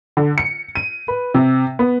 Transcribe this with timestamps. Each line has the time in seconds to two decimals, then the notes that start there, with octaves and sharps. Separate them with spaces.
0.17 D3
0.38 C#7
0.75 D#7
1.08 B4
1.34 C3
1.79 B3